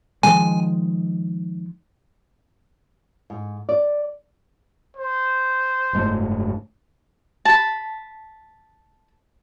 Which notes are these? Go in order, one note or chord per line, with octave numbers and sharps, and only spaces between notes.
D#3 F3 G#3 G#5
G#2
D5
C5
F#1 G#2 A3
A5 B5